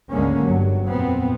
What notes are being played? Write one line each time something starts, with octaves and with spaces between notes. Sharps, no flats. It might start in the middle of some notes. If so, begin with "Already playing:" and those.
G#1 D2 D3 G#3 A#3 C#4
G1 G2 F#3
F2 A#2 B3 C4